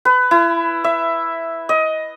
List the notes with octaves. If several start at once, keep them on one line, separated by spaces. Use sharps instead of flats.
B4
E4
E5
D#5